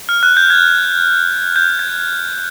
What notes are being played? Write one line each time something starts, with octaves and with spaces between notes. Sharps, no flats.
F6
F#6
G6
G#6
G6
G#6